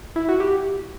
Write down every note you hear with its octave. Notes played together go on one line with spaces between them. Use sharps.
E4
F#4
G4